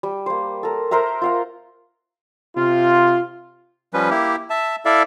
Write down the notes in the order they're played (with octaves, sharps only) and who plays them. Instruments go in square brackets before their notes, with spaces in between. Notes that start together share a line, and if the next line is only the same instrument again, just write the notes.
[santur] G3
A#3 C5
A4 A#4
A#4 C5 E5 A#5
F4 F5 F#5
[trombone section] C3 F4
[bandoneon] F3 G3 C#4 B4
A#3 E4 G4
E5 A5
E4 A4 D5 E5 F5